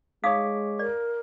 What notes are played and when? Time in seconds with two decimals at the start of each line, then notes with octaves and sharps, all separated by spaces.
0.24 G#3 D#4 C#5 F5 D6 D#6 B6
0.79 A#4 D5